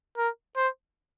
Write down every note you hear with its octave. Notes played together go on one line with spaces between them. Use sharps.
A#4
C5